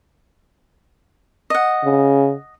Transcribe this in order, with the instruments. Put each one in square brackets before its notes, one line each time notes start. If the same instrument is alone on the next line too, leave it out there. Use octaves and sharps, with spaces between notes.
[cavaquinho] D#5 F#5
[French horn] C#3